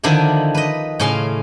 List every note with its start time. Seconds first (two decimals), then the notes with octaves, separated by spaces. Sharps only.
0.04 D3 D#3 F3 D4 E4
0.55 B4 D#5
1.00 A2 C#3 C#4 F5 C6